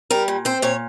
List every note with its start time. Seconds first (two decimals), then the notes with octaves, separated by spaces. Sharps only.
0.10 G3 A#4
0.28 A#2
0.45 C4 C5
0.62 A#2 C#5